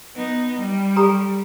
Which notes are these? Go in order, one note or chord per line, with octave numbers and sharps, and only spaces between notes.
B3 D#4
G3
G4 A4 A#5